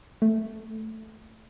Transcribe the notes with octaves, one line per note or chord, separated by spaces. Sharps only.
A3